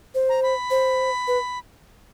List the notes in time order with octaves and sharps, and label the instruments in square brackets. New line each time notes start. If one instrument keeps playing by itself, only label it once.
[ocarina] C5
[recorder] A#5
B5
[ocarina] C5
B4